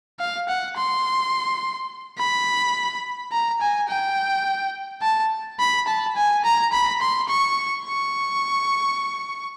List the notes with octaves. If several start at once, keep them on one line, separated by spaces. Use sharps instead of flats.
F5
F#5
C6
B5
A#5
G#5
G5
A5
B5
A5
G#5
A#5
B5
C6
C#6
C#6